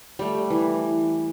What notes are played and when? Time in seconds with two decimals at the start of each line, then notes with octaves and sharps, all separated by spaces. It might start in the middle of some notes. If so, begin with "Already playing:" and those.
0.19 G3 A3
0.50 E3